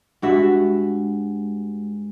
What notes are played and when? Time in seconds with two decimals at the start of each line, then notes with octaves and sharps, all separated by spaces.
0.22 G2 G#3 F#4 E5